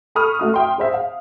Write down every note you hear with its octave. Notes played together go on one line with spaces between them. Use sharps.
A4 B5 C#6 D#6 F6
A3 F#4 D#6
E5 G5 C6
G#4 C5 E5
F5